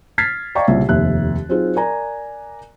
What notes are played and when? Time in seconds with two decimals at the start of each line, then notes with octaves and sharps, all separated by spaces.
0.18 F6 G#6 A6 B6 C7
0.55 D5 D#5 F5 G5 A#5 C#6
0.67 C2 A#2 C#3 G4 E5
0.89 F1 D#2 E5 F#6
1.49 F#3 C4 D#4 F4 G#4
1.75 A#4 D5 G#5 A#5